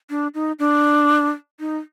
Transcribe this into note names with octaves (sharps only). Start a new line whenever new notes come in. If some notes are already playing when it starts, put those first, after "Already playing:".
D4
D#4
D4
D#4